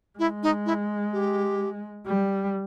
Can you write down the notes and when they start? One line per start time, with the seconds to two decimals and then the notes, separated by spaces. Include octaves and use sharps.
0.19 G#3 E4
0.43 D#4
0.66 E4
1.13 G4
2.06 G3